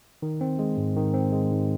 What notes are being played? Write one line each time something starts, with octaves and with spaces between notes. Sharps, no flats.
D#3
C4
G#3
G#2
D#3
C4
G#3
G#2